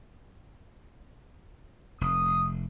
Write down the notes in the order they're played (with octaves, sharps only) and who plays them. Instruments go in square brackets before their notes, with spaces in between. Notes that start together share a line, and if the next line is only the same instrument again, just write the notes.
[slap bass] F1 [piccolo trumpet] D#6